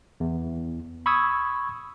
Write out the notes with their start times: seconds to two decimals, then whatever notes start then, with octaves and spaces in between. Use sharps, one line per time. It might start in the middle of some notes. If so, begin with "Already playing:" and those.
0.20 E2
1.06 B5 C#6 D#6 E6 G#6